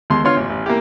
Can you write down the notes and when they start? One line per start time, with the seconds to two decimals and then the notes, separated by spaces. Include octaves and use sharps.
0.10 D#2 G#3 C6
0.24 D3 B3 F4 C#5 C6 F6
0.37 A1
0.50 A1
0.66 A#3 E4 G4